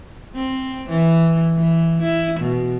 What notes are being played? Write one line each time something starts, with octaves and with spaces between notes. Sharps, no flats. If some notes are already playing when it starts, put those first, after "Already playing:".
C4
E3
E3
E4
B2